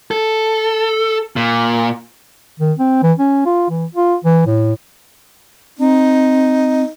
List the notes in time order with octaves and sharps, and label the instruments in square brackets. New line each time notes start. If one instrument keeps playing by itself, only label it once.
[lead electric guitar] A4
A#2
[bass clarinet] D#3
C4
E3
C#4
F4
E3
F4
E3
A2
[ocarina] C4 [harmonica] D#4